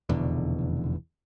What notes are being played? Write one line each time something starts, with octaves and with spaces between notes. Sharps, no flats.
F1 E2 B2 D3